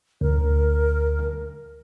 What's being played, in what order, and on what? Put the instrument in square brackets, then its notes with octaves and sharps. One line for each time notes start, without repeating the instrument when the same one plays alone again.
[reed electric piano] D2 [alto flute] A#4